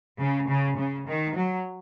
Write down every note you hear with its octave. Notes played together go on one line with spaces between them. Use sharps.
C#3
C#3
C#3
D#3
F#3